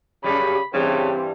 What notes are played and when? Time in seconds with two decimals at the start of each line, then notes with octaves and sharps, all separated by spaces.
0.24 F#2 C#3 G3 B5
0.74 G2 C#3 E3 G3 C4